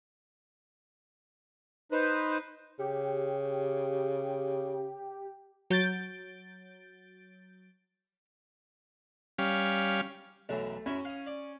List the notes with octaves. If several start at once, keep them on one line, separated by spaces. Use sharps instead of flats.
D#4 B4 C5
C#3 G4
F#3 G6 A6 D7
G3 C#4 F5
B1 F#2 E3 A3
F#2 C#4 E4
F5 D#6
D5